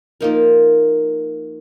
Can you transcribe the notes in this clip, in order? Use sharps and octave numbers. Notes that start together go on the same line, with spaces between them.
F3 A#3 D#4 A#4